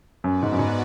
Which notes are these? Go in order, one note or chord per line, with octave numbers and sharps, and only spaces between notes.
F#2 B3 F#4 B4 D5
G#2
F#2
G#2